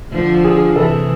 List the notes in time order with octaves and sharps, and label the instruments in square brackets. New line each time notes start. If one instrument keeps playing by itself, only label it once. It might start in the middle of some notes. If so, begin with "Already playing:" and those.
[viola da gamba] D3 F3
[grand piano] G#4
[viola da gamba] C3 E3 [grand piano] A4